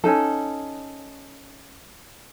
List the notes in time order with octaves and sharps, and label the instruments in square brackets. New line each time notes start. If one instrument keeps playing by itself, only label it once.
[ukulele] C#4 D#4 A4